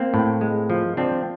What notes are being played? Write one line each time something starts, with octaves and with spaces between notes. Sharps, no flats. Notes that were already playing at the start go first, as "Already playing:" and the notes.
Already playing: A#3 C4
A2
G#3
F3
F3 C4 D4